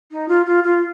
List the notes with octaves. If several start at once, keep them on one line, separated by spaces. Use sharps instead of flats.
D#4
F4
F4
F4